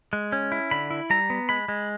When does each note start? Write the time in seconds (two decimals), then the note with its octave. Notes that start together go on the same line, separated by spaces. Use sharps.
0.13 G#3
0.32 C#4
0.52 E4
0.71 D3 B5
0.90 E4
1.10 G3 A#5
1.30 B3
1.49 G#3 B5
1.68 G#3